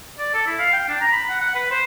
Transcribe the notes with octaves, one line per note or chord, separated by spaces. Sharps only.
D5
A4
E4
F5
G5
D4
A#5
B5
F#5
F#5
B4
C5